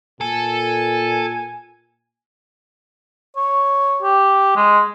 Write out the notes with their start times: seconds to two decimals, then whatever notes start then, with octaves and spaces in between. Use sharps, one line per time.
0.21 A#2 A4 G#5
3.37 C#5
4.03 G4
4.56 G#3